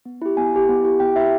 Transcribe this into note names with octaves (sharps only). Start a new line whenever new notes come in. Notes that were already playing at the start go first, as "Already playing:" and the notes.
B3
E4 G4
B3 G#5
E4 G4
B3
E4 G4
B3 G5
E4 G4 E5